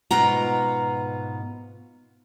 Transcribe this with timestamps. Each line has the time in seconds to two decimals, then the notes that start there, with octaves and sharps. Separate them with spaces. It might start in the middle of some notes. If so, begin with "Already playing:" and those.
0.11 G#2 B2 B3 F4 F#5 A#5